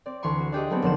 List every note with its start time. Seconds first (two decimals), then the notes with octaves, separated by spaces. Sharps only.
0.06 C4 D5
0.23 D2 E3 C6 C#6
0.40 F#4
0.52 D4 G4 G#4 D#5
0.70 F#3 A3 B3 C4
0.82 F1 D3 A#3 C5 F#5 E7